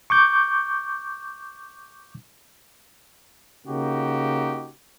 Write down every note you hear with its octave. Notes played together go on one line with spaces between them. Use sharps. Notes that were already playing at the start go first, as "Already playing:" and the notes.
C#6 D6 G6
C#3 A#3 D#4 F#4 G4